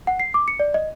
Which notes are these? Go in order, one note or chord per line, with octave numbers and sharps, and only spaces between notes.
F#5
C7
D6
C#7
D5
D#5